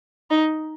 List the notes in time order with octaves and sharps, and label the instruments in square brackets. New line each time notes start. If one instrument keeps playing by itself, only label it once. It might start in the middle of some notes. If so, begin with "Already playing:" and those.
[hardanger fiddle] D#4